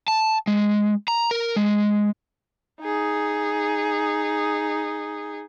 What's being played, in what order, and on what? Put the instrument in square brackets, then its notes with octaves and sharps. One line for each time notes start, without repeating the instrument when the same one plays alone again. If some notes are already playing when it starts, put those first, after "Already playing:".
[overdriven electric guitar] A5
G#3
A#5
A#4
G#3
[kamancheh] D#4 G#4